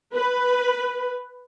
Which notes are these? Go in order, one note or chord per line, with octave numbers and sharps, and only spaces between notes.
B4